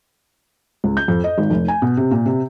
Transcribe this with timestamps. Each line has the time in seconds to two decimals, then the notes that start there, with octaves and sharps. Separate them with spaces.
0.84 C#2
0.97 G6
1.08 F2
1.24 D#5
1.38 G#1
1.50 F1
1.68 G#5
1.82 B2
1.97 C3
2.11 A#2
2.26 C3